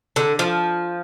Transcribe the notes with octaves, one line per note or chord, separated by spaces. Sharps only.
D3
F3